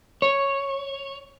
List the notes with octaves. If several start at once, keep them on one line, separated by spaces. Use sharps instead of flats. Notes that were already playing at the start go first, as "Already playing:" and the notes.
C#5